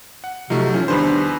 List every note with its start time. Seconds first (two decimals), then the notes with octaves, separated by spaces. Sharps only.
0.24 F#5
0.50 C3 F3 F#3 A3 D#4
0.74 E3 F3 C#4
0.88 E2 D#3 F3 G3 D4 B4 C5